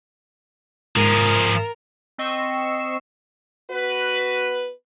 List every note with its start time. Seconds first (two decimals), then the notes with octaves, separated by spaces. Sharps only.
0.96 G#2 F3 G#4 A#4
2.18 C4 D#5 C#6 E6 C7 E7
3.70 B3 F#4 B4